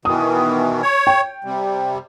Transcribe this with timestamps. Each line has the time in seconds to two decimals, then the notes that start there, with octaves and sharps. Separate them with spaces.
0.05 B2 D#3 E3 D#6
0.82 C#5
1.07 G5
1.44 C3 G3